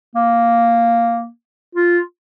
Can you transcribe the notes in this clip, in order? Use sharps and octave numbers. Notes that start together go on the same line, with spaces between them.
A#3
F4